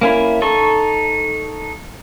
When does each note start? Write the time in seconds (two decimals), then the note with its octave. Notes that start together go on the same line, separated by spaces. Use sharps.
0.01 A#3 C#4 E4
0.42 D#4 A4 C#6